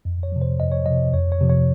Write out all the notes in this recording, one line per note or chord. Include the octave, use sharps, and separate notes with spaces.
F2
C#5
C3 F3
C5
F2 D#5
C#5
C3 F3 D#5
F2 C#5
C#5
C3 F3
C#5